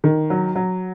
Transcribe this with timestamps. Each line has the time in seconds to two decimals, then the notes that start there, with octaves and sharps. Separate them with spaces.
0.04 D#3
0.30 F#3
0.55 F#3